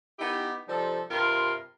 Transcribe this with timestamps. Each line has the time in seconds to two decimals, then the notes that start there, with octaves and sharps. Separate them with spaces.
0.19 B3 D#4 E4 G4
0.68 C3 F3 G3 D#4 A4
1.11 G2 C3 F4 A#4 B5 C6